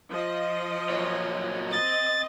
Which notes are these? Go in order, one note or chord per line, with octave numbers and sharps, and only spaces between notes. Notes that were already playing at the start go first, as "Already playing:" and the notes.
F3 D#5
A#2 F#3 C#5
C4 D#5 A6